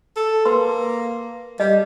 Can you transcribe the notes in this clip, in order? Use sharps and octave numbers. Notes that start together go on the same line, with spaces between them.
A4
A#3 B4 C6
G3 D#5